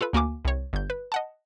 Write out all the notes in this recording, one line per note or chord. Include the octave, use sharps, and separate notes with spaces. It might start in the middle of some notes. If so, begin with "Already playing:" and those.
F4 A4 B4
D2 A#3 F#4 G#5 D6
C2 C#5
G1 G6
B4
D#5 F#5 A5